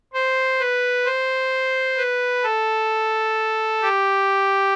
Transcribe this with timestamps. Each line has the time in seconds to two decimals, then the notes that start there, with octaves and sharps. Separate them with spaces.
0.13 C5
0.59 B4
1.06 C5
1.97 B4
2.44 A4
3.82 G4